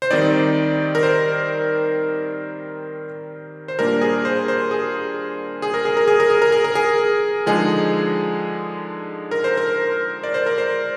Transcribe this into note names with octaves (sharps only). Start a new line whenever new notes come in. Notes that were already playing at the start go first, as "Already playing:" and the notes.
C5
D#3 G3 C4 D#4 D5
A#4
C5
C5
A#2 G3 A#3 D4 A#4
G#4
C5
C5
G#4
G#4
A#4
G#4
A#4
G#4
A#4
G#4
A#4
G#4
A#4
G#4
D3 F3 G#3 D#4 G#4
A#4
C5
A#4
D5
C5
A#4
C5